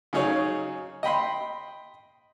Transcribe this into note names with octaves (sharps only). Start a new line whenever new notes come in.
C#3 F#3 C#4 D#4 G#4 C#5
D#5 G5 B5 C6